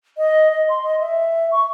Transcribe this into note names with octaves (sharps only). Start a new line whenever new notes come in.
D#5
D#5
C6
D#5
E5
C#6